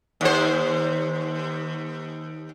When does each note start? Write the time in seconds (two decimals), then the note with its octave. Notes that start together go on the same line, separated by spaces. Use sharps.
0.21 D#2 C5